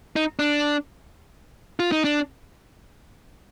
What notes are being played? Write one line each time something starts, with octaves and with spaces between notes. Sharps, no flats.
D#4
D4
F4
D#4
D4